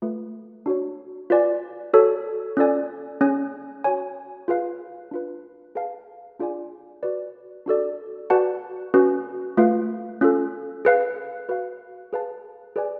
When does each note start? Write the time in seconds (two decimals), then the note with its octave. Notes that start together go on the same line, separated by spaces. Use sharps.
0.02 A3 F4 B4
0.66 D4 F#4 C#5
1.30 F4 B4 D5 G#5
1.93 F#4 A4 C#5 F#5 A5
2.57 C#4 F4 A4 D5 G#5
3.21 C#4 G#4 C#5 G#5
3.84 F#4 C#5 G#5
4.48 F4 G#4 B4 F5
5.11 D4 F4 B4
5.75 G#4 B4 F5 A5
6.39 D4 F4 G#4 D5 G#5
7.03 F#4 B4 D5
7.66 D4 F#4 A4 D5
8.30 F#4 B4 D5 F#5 A5
8.94 C#4 F#4 B4
9.57 A3 F4 B4 F5
10.21 C#4 F4 A4
10.85 G#4 B4 F5
11.49 F#4 B4 F5
12.13 G#4 B4 F5 A5
12.76 G#4 B4 D5 G#5